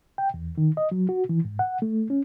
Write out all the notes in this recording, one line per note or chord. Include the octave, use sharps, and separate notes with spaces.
G5
E2
D#3
D#5
F#3
F#4
E3
G#2
F#5
A3
C#4